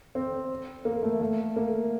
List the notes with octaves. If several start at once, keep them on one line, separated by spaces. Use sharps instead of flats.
C4
A#3
A3
A3
A#3